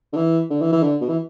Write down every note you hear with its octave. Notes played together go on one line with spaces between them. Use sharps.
D3
E3
D3
E3
E3
D3
B2
E3